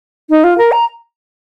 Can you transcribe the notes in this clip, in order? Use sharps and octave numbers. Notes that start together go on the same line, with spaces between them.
D#4
F4
A#4
A#5